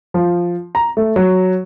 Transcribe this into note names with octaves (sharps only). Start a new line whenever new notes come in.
F3
A#5
A3
F#3